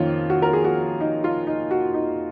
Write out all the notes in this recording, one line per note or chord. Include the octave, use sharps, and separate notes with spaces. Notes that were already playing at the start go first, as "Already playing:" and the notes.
Already playing: F2 D#3 A#3 C#4 F4
F#4
A#4
G#4
F#4
D#4
F4
D#4
F#4
D#4